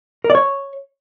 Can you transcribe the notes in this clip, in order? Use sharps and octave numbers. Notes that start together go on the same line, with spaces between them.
A#4
D5
C#5